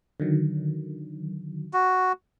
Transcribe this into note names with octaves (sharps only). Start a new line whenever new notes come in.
D3 D#3 F#3
F#4